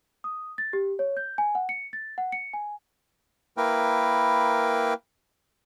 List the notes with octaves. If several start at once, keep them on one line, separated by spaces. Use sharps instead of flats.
D#6
A6
G4
C#5
G6
G#5
F#5
C#7
A6
F#5
C#7
G#5
A#3 E4 A#4 B4 G5